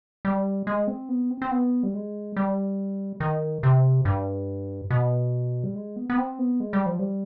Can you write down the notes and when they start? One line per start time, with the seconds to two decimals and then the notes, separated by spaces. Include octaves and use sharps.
0.25 G3
0.67 G#3
0.88 C4
1.09 B3
1.30 C4
1.42 C4
1.51 B3
1.83 G3
1.94 G#3
2.36 G3
3.20 D#3
3.63 C3
4.05 G2
4.90 B2
5.64 G3
5.75 G#3
5.96 B3
6.10 B3
6.18 C4
6.39 B3
6.60 G#3
6.73 G3
6.86 F3
6.99 G3